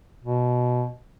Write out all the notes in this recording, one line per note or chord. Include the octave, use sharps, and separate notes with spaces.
B2